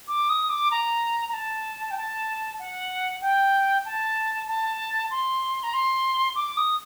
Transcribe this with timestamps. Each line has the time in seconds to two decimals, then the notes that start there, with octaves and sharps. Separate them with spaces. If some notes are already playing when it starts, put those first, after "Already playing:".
0.08 D6
0.30 D#6
0.50 D6
0.71 A#5
1.28 A#5
1.33 A5
1.91 G5
1.97 A5
2.59 F#5
3.22 G5
3.85 A5
4.48 A5
5.11 C6
5.63 A#5
5.73 C6
6.36 D6
6.57 D#6